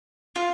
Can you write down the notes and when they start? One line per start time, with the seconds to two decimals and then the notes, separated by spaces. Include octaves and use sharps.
0.36 F4